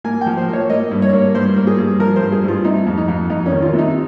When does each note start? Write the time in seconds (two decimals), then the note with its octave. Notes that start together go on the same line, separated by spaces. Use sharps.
0.04 A#3 G#5
0.21 G5
0.26 F3
0.37 C5
0.48 A#3
0.53 C#5
0.70 A#3 D#5
0.91 G2
1.02 C#5
1.13 A#3
1.34 G2 C5
1.56 A#3
1.67 G#4
1.78 G2
1.99 F3 A#4
2.16 C5
2.21 G2
2.32 G#4
2.43 G2 F4
2.64 C3 D#4
2.86 F2
2.97 D#4
3.08 F2
3.30 F2 D#4
3.46 C#4
3.52 D#3
3.62 F4
3.73 C3
3.78 D#4